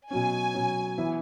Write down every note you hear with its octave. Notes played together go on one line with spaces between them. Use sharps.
B2 F#3 C#4 G#5
B2 F#3 C#4
E3 B3 E4